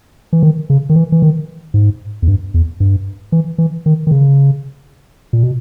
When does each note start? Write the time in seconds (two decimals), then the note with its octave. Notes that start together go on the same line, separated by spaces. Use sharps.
0.33 E3
0.43 D#3
0.70 C#3
0.90 D#3
0.96 E3
1.12 E3
1.22 D#3
1.74 G#2
2.22 E2
2.28 G2
2.54 E2
2.80 G2
3.32 E3
3.58 E3
3.86 D#3
4.07 D#3
4.11 C#3
5.33 A#2
5.43 B2